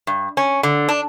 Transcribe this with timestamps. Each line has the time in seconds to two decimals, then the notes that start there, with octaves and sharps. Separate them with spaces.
0.07 G2
0.37 C#4
0.63 D3
0.89 D4